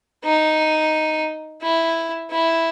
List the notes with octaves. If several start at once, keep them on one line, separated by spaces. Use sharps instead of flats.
D#4
E4
E4